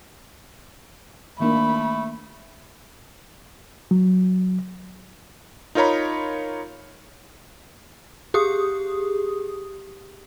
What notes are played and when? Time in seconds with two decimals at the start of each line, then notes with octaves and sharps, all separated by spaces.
1.40 D#3 A3 A#3 D4 B5
3.91 F#3
5.75 D#4 F4 A#4 C#5 A#5 B5
8.34 G4 G#4 D#6